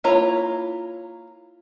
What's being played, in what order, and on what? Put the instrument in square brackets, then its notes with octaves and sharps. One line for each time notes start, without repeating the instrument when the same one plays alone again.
[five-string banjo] A#3 E4 F4 C#5 A#5